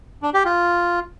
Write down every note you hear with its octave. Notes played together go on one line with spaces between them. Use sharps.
D4
G4
F4